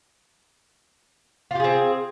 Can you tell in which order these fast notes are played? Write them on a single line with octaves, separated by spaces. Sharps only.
F4 G4 G#4 C4